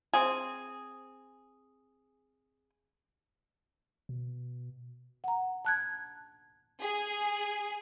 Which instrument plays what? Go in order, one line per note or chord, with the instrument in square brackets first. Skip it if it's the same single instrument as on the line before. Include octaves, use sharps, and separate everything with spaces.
[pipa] C4 G#4
[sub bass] B2
[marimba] F#5 A#5
A5 F#6 G#6
[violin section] G#4